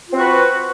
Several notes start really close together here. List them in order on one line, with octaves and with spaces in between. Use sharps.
F4 C4 F#4 B4